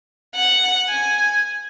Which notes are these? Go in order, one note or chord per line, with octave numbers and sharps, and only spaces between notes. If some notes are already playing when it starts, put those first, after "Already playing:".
F#5
G#5